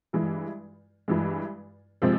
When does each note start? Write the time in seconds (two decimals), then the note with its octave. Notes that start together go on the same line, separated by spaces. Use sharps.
0.13 G2 E3 G#3
1.08 G2 E3 G#3
2.02 C3 F3 G#3 C4